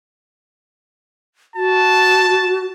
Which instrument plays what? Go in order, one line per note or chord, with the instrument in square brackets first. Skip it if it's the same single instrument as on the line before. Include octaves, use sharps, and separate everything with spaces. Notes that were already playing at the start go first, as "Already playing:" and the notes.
[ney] F#4 [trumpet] A5